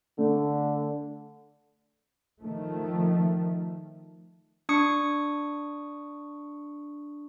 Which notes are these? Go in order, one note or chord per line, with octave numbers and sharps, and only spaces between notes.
D3 A3
D#3 F3 A3
D4 C#6 D#6 C#7